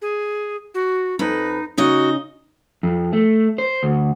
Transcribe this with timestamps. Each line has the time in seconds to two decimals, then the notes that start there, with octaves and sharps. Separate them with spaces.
0.02 G#4
0.74 F#4
1.19 F2 D#4 B4
1.78 C#3 D#4 F#4 D#5
2.83 F2
3.13 A3
3.58 C5
3.83 D2